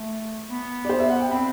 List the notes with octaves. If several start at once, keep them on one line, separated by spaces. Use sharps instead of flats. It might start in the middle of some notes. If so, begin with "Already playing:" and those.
Already playing: A3
B3
D5
C5
E5
F#5
G5
C4 B5